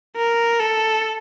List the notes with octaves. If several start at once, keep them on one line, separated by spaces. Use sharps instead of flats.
A#4
A4